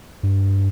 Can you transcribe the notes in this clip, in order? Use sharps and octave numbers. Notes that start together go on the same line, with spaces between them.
G2